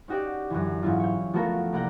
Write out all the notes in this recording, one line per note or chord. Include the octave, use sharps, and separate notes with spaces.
C#4 D#4 F#4 G4 D5
F#2 D3 E3
G#2 E3 C#4 E4 F4
C#5 G6
F3 A3 B3 F#4 A4 A#4
C2 A#3 D5 F#5 A#5 G6